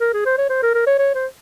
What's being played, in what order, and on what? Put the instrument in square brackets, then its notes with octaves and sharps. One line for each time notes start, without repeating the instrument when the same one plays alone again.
[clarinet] A#4
G#4
C5
C#5
C5
A#4
A#4
C#5
C#5
C5